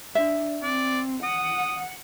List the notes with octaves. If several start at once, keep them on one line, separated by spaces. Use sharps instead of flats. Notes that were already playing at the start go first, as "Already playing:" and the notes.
D4 E5
C4 D5
F#5 D#6